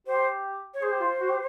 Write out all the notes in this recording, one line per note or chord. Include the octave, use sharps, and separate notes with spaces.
G4 C5
C#5
G#4 C5
G4
F4
F#4
G4